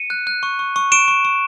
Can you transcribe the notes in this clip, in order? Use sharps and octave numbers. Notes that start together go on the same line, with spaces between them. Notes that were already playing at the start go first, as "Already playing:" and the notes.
Already playing: C#7 D#7
F#6
F#6
C#6
C#6
C#6
C#6 D7 E7
C#6
C#6